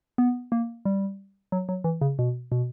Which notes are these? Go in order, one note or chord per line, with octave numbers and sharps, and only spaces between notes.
B3
A#3
G3
F#3
F#3
E3
C#3
B2
B2